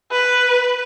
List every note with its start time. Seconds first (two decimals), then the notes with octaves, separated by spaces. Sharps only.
0.12 B4